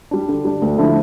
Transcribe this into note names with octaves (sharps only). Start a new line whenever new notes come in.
G3 D4
D3
G3 D4
D2
D3 F3 A3 E4